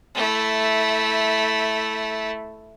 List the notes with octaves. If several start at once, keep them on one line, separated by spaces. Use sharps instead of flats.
A3 E4